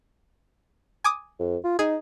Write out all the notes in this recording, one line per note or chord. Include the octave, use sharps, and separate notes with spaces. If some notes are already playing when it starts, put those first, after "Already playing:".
G#5 D6 D#6
F2
F4
D#4 G#4